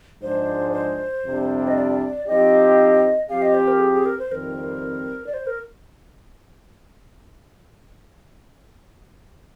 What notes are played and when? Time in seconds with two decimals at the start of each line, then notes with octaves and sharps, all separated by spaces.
0.22 G#2 F3 G#3 D4 C5
0.73 C5
1.24 F2 C3 G3 D4
1.68 D#5
1.76 D5
2.27 F3 C4 D#4 G4 D#5
3.29 F3 C4 G4 F5
3.42 D#5
3.54 C5
3.68 A#4
3.80 G#4
3.93 G#4
4.06 A#4
4.19 C5
4.31 F2 D#3 G3 C4 A#4
5.27 D5
5.34 C5
5.47 A#4